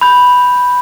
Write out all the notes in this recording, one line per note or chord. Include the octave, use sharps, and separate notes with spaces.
B5 G6